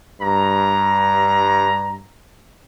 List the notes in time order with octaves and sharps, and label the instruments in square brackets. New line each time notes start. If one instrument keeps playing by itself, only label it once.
[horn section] G2 A#5